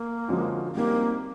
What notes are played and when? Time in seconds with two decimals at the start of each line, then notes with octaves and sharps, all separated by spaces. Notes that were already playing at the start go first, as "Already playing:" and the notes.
Already playing: A#3
0.28 D3 F3 G#3 C#4 F#4
0.75 G3 A#3 C4 D#4 G4